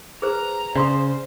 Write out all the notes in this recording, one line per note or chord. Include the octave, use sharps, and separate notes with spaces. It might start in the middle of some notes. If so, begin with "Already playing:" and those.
G#4 B4 C5 A#5
C#3 C5 D5 C6 D#6